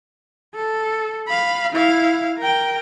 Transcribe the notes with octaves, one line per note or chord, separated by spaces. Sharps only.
A4
F5 B5
E4 F5
A#4 G5